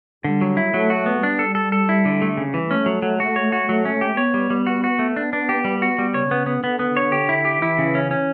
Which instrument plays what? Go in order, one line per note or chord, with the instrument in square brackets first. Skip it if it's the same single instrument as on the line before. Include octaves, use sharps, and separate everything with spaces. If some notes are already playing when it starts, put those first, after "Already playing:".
[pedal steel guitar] D3 [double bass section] G3
[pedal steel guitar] F#3
E4
[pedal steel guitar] F#3 [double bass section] A3
[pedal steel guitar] F#4
B3
[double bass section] G3 [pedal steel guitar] D4
[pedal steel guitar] A4
A4
A4
E4
D3
A3
C#3
E3
[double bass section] A3 [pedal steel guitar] C#4
[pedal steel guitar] F#3
F#3
F#4
C#5
F#4
[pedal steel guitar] F#3 [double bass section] A3
[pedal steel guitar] C#4
G4
[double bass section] B3 [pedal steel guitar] C#5
[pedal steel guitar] G3
G3
F#4
F#4
A3
[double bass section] B3 [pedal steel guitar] D4
[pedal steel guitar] D4
G4
G3
F#4
G3
[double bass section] C#3 [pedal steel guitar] C#5
[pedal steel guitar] B3
B3
[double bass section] D3 [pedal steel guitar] B3
[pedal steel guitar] B3
C#5
G4
E4
G4
[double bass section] E3 [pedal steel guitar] E4
[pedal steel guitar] C#3
C#4
C#4